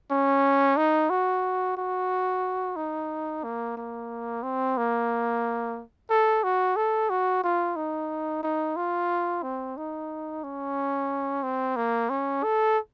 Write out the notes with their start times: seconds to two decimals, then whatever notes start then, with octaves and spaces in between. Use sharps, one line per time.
0.10 C#4
0.77 D#4
1.10 F#4
1.77 F#4
2.76 D#4
3.44 A#3
3.77 A#3
4.43 C4
4.77 A#3
6.10 A4
6.43 F#4
6.76 A4
7.10 F#4
7.43 F4
7.76 D#4
8.43 D#4
8.76 F4
9.43 C4
9.77 D#4
10.44 C#4
11.43 C4
11.76 A#3
12.09 C#4
12.43 A4